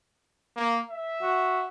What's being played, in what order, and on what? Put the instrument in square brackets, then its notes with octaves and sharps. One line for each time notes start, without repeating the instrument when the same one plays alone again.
[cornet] A#3
E5
[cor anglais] F#4